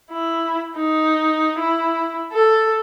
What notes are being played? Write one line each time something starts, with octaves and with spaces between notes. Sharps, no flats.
E4
D#4
E4
A4